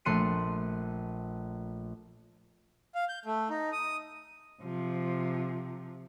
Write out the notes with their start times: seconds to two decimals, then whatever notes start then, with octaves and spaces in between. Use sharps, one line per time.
0.05 A#1 A3 C6 F#6 C#7 D#7
2.95 F5
3.09 G6
3.25 A3
3.50 D#4
3.72 D#6
4.63 C3 F3